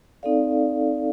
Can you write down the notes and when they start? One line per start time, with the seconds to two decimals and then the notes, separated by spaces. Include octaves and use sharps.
0.23 C4 D#4 A4 D5 F5